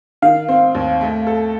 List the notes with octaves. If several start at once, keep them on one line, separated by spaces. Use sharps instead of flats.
D#3 F5
C4
D#2
A3
A4